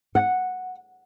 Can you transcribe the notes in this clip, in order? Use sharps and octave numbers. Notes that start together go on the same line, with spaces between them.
F#5